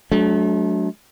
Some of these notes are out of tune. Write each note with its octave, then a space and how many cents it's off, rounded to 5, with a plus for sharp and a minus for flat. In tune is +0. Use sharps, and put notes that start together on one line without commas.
F#3 +0 A3 -40 D4 -20